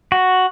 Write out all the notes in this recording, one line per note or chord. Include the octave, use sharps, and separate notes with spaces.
F#4